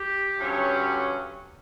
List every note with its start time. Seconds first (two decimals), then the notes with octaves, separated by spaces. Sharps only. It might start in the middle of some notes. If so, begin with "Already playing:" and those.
Already playing: G4
0.39 G2 D3 F#3 C#4